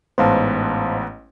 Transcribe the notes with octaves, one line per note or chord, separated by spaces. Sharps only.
A1 G#2 B3 C5 F5 A5